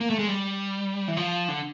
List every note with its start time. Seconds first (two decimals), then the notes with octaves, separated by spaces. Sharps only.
0.01 A#3
0.10 A3
0.19 G#3
0.27 G3
1.08 E3
1.17 F3
1.49 D3